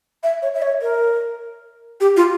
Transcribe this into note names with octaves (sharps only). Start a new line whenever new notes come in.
E5
C#5
E5
C#5
A#4
G4
F4